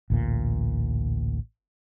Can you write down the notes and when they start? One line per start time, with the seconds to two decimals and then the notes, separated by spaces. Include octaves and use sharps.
0.10 A1 D2 A#2